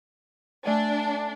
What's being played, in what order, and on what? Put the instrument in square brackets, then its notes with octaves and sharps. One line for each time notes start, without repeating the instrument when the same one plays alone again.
[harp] A3 G#5 [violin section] D4